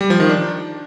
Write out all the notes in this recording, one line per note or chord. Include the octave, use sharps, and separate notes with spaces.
G3
F3
D#3
D4